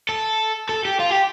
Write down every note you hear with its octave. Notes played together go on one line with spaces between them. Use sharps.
A4
A4
G4
F4
G4